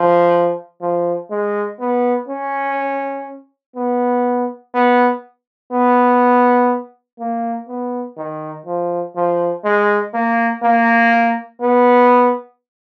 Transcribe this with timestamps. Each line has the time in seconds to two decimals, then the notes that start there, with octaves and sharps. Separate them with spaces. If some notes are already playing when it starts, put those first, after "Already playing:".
Already playing: F3
0.81 F3
1.31 G#3
1.80 B3
2.29 C#4
3.76 B3
4.74 B3
5.72 B3
7.20 A#3
7.68 B3
8.17 D#3
8.66 F3
9.16 F3
9.65 G#3
10.14 A#3
10.63 A#3
11.61 B3